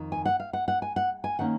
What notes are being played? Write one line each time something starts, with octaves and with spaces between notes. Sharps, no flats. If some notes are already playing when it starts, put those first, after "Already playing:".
Already playing: F2 D#3
G#5
F#5
F5
F#5
F#5
G#5
F#5
G#5
D#3 A#3 C#4 F#5